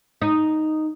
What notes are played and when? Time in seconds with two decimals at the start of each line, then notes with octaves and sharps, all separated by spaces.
0.22 D#4